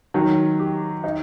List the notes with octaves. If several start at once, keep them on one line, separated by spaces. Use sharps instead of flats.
D#3 F#3
G4
D#4